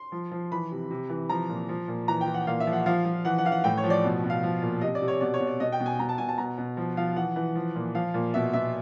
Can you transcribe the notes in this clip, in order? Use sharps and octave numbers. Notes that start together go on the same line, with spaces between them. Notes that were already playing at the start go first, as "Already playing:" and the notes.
Already playing: C6
F3
F3
E3 B5
C3
C3
E3
F3 A#5
A#2
F3
A#2
E3 A#5
G5
E3
F#5
A#2 F5
E5
F3
F#5
F3 F5
F3
E3 F#5
F#5
E3 F5
F#5
A2 G5
C#5
F3
D5
B2
B2
F5
F3
A#2
C3 D#5
D5
C3
C#5
B2 D5
C#5
B2
D5
B2 D#5
G5
B2
G#5
B2 A#5
A5
B2 G#5
A5
B2 A#5
B2
F3
F3 F5
E3 F#5
E3
F3
A#2
F3 F5
A#2
B2 E5
B2 E5